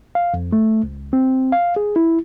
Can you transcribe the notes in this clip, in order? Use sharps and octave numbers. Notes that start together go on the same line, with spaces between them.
F5
F2
A3
C#2
C4
F5
G#4
E4